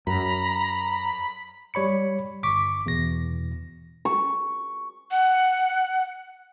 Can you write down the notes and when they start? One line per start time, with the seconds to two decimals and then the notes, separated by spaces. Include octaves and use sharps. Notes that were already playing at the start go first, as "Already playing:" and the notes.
0.07 F#2 A#5 B5
1.74 G3 C#5 B5 C#7
2.43 G1 C#6 D6 B6
2.86 E2 B2 A#6
4.05 C#6
5.11 F#5